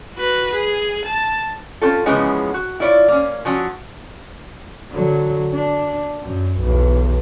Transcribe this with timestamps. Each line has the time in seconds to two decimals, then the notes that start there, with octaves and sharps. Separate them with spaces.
0.15 F#4 B4
0.54 G#4
1.05 A5
1.82 C4 C#4 F4 A4
2.06 C#3 E3 F3 G#3 B3 C#4
2.54 F#4
2.80 E4 F4 C#5 D5
3.08 A#3 C#4
3.45 F3 F#3 C#4 F#4
4.92 D3 F#3
5.54 D4
6.22 F#2
6.60 B1 E2